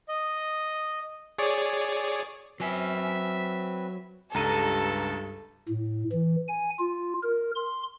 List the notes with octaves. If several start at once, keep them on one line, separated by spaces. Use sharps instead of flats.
D#5
G#4 C#5 D5
F#3 C4 B4 E5 G#5
C#2 G2 A4 A#5 D#7
A2
E3
G#5
F4
A#4
C6